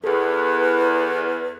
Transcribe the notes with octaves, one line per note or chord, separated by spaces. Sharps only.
E2 G#4 A4 B4